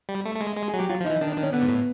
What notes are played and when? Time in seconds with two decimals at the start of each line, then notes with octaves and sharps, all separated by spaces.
0.09 G3
0.25 A3
0.36 A3
0.41 G#3
0.57 G#3
0.68 G#4
0.74 F#3
0.79 G4
0.89 F#3 F4
1.00 F3
1.05 D#4
1.10 E3
1.21 D#3 D4
1.32 D4
1.37 D#3
1.43 C#4
1.53 D3 B3
1.62 G#2
1.69 A2